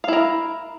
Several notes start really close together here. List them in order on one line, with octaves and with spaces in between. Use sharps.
F5 E4 A#4